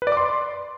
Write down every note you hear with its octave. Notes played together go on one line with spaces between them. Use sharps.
B4
D5
D6
C6